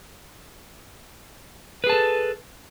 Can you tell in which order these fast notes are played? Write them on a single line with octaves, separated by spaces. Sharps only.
B4 G#4 A5 A4